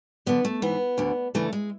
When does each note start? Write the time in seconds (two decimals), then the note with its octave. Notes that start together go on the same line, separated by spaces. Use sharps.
0.26 F#2 D3 B3
0.45 A3
0.62 G#2 E3 B3
0.98 D2 D3
1.35 D2 C#3 E3 A3
1.53 G#3